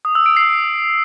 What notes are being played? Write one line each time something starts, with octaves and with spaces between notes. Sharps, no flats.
D#6
E6
D7
C7